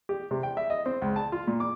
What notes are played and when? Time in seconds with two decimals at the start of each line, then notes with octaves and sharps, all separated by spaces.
0.09 G4
0.31 C3
0.43 G5
0.57 E5
0.70 D#5
0.86 C4
1.02 C#2
1.16 A5
1.32 F4
1.47 A#2
1.60 D6